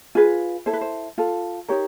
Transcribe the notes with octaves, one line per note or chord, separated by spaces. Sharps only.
F4 G#4 B4
E4 A4 C5
B4
C5
F4 A4
D#4 G4 A#4 C#5